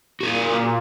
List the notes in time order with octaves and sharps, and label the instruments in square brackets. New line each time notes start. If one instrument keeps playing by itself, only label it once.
[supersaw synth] A#2 [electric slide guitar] F#4 G#4